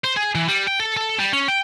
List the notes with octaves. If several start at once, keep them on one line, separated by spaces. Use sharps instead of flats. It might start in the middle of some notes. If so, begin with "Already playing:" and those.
C5
G#4
E3
G3
G5
A4
A4
G3
C#4
G5